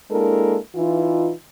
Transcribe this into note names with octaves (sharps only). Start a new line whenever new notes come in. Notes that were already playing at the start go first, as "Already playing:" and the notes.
G#3 A#3 D4 E4 A4 A#4
E3 D#4 F4